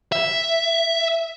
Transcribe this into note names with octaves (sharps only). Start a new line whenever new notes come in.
E5